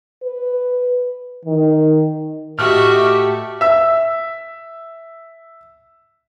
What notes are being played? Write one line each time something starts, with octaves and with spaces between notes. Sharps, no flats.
B4
D#3
A2 A3 F#4 G4 D#5 E5 F6
E5 E6